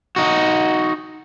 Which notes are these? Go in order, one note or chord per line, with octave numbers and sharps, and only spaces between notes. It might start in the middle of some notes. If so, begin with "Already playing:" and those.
D#4 F#4